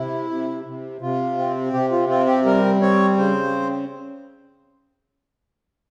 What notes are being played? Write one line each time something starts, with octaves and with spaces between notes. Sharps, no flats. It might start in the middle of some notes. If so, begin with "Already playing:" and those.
Already playing: C3 E4
C3
C3
C3 F4
C4
C3 G4
F4
C4 F4
G4
G3 A#4
C4 C#5
C#3 C5